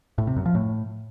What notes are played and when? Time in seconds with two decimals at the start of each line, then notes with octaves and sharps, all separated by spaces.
0.18 A2
0.27 C3
0.36 F#2
0.46 F3
0.55 A2